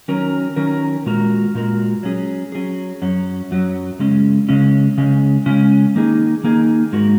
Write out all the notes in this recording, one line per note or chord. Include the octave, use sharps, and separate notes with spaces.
D#3 F#3 C#4 A#4
D#3 F#3 C#4 A#4
A#2 G#3 F#4 A#4
A#2 G#3 F#4 A#4
F#3 C#4 G#4
F#3 C#4 G#4
F#2 F#3 C#4
F#2 F#3 C#4
C#3 G#3 C#4
C#3 G#3 C#4
C#3 G#3 C#4
C#3 G#3 C#4
D#3 A#3 D#4 G#4
D#3 A#3 D#4 G#4
G#2 G#3 F#4 A#4